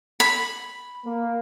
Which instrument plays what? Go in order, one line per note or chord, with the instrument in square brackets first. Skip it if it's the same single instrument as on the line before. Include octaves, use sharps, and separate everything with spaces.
[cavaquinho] B5
[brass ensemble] A#3